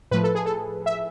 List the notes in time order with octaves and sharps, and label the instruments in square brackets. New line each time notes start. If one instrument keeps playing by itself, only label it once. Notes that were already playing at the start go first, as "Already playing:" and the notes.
[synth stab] A2 F3 A3 B4
A4
G#4
A4
E5